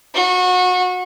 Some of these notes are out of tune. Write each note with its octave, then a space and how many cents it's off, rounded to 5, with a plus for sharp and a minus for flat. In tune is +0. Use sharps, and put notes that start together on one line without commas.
F#4 -25